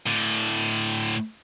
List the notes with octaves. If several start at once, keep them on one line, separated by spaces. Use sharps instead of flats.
A2 D3